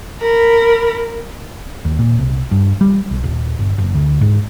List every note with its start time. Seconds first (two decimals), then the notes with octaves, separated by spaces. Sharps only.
0.21 A#4 B5
1.85 D#2
1.99 A#2
2.19 C2
2.51 G2
2.81 G3
3.11 B1
3.24 D#1
3.59 G1
3.78 F#1
3.94 D2
4.21 G#2